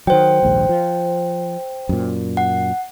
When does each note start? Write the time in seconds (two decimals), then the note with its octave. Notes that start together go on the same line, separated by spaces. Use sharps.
0.07 D#3 F#3 C5 G5
0.43 A#1 D#2 G#2
0.69 F3
1.89 F#2 A#2
2.37 F#5